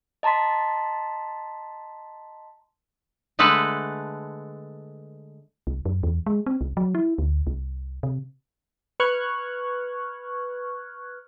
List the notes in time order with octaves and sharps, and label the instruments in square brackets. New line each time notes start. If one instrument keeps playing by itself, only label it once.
[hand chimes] D#5 A5 A#5 C6 B6
[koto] D3 G#3 A3 A4 B4
[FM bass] C2
F#2
E2
G#3
C4
C2
F#3
E4
D2
C2
C3
[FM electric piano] B4 C#6 F6 F#6 G#6